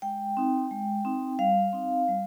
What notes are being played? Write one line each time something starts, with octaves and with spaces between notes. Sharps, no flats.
G#3 G5
C4 D#4
G#3
C4 D#4
G3 F5
C4 D#4
G3